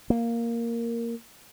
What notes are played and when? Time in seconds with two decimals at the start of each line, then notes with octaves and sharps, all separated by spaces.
0.10 A#3